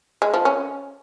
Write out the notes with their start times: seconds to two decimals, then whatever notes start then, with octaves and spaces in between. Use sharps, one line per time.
0.22 G#3
0.34 F3
0.45 C#4